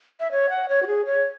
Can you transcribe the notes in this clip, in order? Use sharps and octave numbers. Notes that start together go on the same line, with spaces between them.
E5
C#5
F#5
C#5
F#4
G#4
C#5